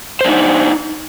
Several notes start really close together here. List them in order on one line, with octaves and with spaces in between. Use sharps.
C5 D4 D#4